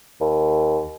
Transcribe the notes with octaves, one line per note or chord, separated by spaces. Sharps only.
D#2